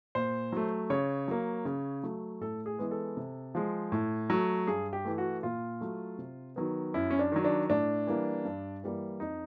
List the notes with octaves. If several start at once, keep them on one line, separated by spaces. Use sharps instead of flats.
A#2 C5
F#3 A3
C#3 C#5
F#3 A#3
C#3
F#3 A3
A2 A4
G#4
E3 G#3 B3
A4
C3
F3 G#3
A2
F#3 A3
G2 G#4
G4
E3 A3
F#4
A#2 F4
F#3 A3
C3
D#3 F#3 B3
F#2 E4
C#4
D4
D#3 F#3
D4
A2 D4
E3 G3 A#3
G2
E3 G3 A#3
F2 D#4